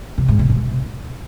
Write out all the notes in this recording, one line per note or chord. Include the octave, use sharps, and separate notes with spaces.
C3
G#2
C3
B2